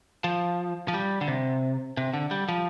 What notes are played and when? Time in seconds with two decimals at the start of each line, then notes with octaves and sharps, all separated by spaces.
0.24 F3
0.88 F3
0.94 G3
1.21 D3
1.28 C3
1.97 C3
2.14 D3
2.31 G3
2.49 F3